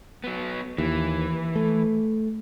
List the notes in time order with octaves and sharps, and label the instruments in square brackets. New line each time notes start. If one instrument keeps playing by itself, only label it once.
[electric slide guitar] F#3 B3
[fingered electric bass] D#2 [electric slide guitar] E3
[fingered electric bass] A3